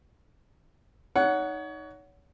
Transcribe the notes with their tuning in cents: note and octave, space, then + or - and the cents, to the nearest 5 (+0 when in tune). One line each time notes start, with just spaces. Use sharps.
D#4 +0 C#5 +30 F#5 +0